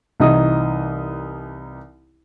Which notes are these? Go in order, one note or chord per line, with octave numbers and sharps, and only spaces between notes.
C2 E3 D#4 D#6